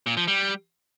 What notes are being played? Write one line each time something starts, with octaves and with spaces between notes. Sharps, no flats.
A#2
F3
G3